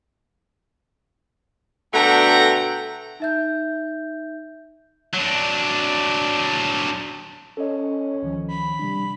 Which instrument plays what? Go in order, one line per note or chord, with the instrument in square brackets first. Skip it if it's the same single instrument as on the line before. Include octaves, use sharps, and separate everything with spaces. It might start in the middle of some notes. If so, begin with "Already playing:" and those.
[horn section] B2 D3 A3 F#5 G5 A#5
[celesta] D#4 E5 G6
[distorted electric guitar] F#3 D4
[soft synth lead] C#4 [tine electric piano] A4 D#5
[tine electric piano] C#2 D#3 F3
[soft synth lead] B5
[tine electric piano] C3 G3 D4